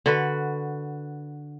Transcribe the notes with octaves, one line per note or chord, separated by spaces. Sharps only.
D3 F#4 B4